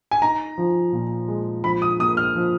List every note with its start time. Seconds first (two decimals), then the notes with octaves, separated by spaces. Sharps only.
0.11 G#5
0.22 D#4 A#5
0.58 F3
0.93 A#2
1.28 G#3
1.64 F3 B5
1.82 D#6
2.00 A#3 D#6
2.17 F6
2.35 F3